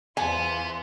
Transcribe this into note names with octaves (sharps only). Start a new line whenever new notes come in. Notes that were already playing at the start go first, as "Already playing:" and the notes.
E2 B3 F4 C5 G#5